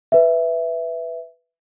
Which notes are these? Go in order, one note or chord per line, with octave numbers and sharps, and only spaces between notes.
B4 E5